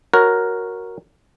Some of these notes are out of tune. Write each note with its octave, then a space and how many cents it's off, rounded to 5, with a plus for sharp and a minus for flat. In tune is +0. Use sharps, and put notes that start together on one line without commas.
F#4 -5 A#4 +0 C#5 +0